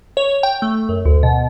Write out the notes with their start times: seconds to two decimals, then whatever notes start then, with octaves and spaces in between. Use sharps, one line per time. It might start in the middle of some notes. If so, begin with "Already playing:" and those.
0.17 C#5
0.43 G5
0.62 A3
0.89 F#2
1.05 D2
1.23 B2